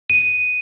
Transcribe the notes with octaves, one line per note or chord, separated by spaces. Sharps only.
D#7